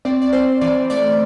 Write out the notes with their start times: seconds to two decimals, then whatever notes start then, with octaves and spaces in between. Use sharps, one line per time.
0.05 C4 D5
0.22 D5
0.33 C4 C5
0.61 E3 D5
0.90 A3 D5